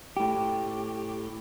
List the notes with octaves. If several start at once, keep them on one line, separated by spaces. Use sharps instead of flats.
A2 G4